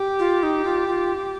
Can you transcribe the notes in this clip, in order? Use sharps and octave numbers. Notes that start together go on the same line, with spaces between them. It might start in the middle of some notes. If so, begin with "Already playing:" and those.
Already playing: G4
F4
D#4
F4
F4